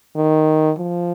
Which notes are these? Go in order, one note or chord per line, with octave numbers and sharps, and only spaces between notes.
D#3
F3